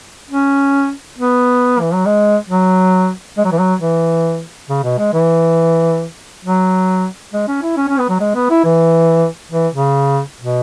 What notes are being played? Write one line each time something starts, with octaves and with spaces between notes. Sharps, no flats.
C#4
B3
E3
F#3
G#3
F#3
G#3
F#3
E3
F#3
E3
C#3
B2
G#3
E3
F#3
G#3
C#4
E4
C#4
C#4
B3
F#3
G#3
B3
E4
E3
E3
C#3
B2